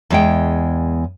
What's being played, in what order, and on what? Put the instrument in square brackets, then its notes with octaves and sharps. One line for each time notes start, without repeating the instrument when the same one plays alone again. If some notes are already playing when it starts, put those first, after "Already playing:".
[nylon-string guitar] E2 G#3 G5